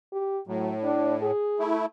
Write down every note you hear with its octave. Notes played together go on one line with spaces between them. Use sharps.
G4
A2 F#3
D4
G#4
A3 E4